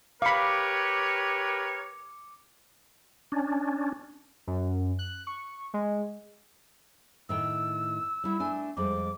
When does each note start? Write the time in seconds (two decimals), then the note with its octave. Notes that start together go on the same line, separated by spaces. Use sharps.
0.22 G4 A#4 B4 C#5 F5 B5 D6 C#7
3.32 C#4 D4
4.47 F#2
4.99 F#6
5.27 C#6
5.74 G#3
7.29 A2 D#3 G5 E6
8.24 G3 E4 F#5
8.40 A3 D4 G#5
8.77 F2 G3 G#3 D6